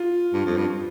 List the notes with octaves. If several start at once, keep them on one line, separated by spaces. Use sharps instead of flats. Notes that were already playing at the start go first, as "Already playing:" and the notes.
Already playing: F4
G2
F2
G2